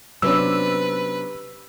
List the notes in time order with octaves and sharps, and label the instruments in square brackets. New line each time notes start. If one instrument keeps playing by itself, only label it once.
[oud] C3 C#4 [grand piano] F#3 B3 D4 [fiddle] B4 [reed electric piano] E6